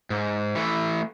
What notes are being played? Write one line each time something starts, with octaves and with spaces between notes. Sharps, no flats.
G#2
E3 A3